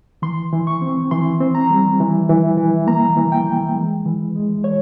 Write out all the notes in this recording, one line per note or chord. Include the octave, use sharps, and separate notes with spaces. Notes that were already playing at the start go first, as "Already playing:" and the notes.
E3 C6
E3
C#6
C4
E3 C6
C4
A#5
G3
E3
E3
E3
A#3 A#5
E3
G5
E3
G#3
E3
G#3
E3 C#5